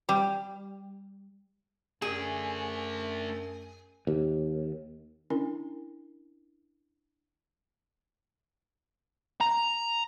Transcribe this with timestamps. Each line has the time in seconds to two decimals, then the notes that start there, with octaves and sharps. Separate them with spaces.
0.09 G3
2.02 F#2 A3 G#4 D5
4.07 D#2
5.30 C#4 D4 E4 A#4
9.41 A#5